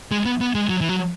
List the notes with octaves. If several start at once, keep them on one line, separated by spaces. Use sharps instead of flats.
G#3
B3
B3
G#3
F#3
E3
F#3